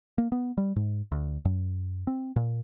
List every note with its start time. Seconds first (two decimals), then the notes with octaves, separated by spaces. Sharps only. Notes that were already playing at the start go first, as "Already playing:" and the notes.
0.18 A#3
0.32 B3
0.58 G3
0.76 G#2
1.12 D2
1.45 F#2
2.07 C4
2.36 A#2